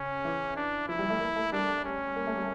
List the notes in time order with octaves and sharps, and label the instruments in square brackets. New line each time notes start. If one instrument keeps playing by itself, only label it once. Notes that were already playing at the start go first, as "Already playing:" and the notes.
Already playing: [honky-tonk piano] C#3 [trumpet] C#4
[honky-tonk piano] E3
[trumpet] D4
[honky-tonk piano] F3 [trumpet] E4
[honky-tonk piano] G3
A3
A#3
A3
[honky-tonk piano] G3 [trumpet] D4
[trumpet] C#4
[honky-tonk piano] A#3
A3
G3